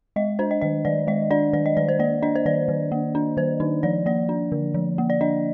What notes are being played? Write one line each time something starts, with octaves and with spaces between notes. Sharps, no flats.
G#3 D#5
D4 C5
D#5
D#3 D#5
D#3 D5
G#3 D#5
D4 D5
D#3 D5
D#5
D#3 D5
C5
A#3 D5
D4 D#5
C5
D#3 D5
D#3
A#3
D4
D#3 C5
D#3 D#4
F3 D5
A#3 D5
D4
D3
F3
A#3
D5
D4 D#5